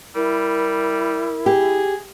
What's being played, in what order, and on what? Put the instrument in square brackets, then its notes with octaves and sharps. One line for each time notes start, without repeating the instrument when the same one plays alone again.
[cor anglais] G3 [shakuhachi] E4 [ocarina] A#4
[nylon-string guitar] G4 [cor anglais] G#4